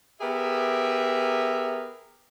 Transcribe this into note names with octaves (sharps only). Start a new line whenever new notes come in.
B3 G4 G#4 A#4 E5